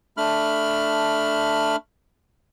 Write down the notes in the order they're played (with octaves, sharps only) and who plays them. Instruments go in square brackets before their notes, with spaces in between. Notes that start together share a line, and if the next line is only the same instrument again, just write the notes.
[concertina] A3 D4 B5 F6